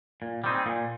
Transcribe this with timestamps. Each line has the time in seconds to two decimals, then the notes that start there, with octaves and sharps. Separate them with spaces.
0.22 A#2
0.44 G3 C4 D#4 G#4
0.66 A#2